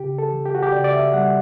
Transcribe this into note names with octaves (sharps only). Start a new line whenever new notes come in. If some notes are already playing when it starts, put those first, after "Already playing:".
Already playing: C#3 G4
A4
E3
G4
F#4
G4
C#3 D5
D5
E5
G3 F#5